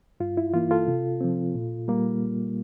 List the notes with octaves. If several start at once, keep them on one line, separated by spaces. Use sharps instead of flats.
G2 F4
E4
E3 A#3 F4
F4 A4
C3
F3 C4
A#2
G3 A#3